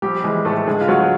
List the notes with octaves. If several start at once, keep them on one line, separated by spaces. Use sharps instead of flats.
A#1 G3 G4
E3 G#3 G#4
A2 A3 A4
D3 G#3 G#4
F4
D2 F#3 F#4